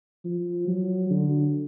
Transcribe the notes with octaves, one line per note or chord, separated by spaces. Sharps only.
F3
F#3
D3